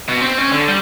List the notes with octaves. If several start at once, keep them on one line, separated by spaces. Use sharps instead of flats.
B2
C4
C#4
D3
G3